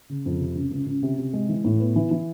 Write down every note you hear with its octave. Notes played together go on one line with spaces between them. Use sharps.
C#3
F2
C3
C#2
C#2
C#2
C3
C3
G#3
E3
A2
B3
E3
E3